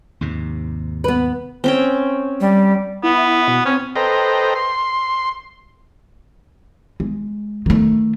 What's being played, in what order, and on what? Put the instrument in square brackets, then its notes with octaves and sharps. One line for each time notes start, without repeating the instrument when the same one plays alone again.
[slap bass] D#2 G#2 C3
[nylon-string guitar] B3 B4
[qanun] C4 C#4 G5
[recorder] G3
[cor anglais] B3 [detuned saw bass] E4
[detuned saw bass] B2
[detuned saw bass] C4 [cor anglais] C#4
[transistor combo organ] A4 B4 C5 D#5 G5 A#5
C6
[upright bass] G#3
D#3 A3